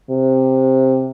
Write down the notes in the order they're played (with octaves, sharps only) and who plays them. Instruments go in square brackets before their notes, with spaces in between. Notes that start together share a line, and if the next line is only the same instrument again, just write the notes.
[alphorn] C3